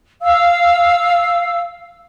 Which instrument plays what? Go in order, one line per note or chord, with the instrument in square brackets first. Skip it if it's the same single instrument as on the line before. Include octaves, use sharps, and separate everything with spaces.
[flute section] F5 E6